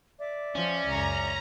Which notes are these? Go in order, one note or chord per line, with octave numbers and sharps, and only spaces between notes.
D5 E5 D6
F3 C#4
C#2 F#2 A#5